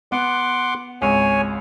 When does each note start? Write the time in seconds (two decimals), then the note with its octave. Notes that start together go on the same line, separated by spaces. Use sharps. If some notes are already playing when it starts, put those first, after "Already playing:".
0.12 B3 F#5 C6 D6
1.02 G#1 C#2 C#5 G#5